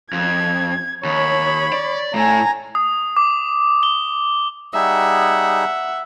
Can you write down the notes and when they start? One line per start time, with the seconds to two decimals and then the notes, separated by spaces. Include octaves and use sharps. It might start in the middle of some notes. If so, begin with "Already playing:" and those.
0.13 F2 G#6
1.04 D#2 C#5 B5
1.73 D5
2.14 A2 A3 G#5 A#5
2.75 D#6
3.17 D6
3.83 G7
4.74 G3 D#4 G#4 E5 F#5